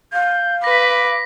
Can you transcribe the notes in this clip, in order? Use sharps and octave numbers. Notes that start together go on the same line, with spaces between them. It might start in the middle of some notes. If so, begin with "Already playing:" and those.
F5 G6
B4 D6 A#6 B6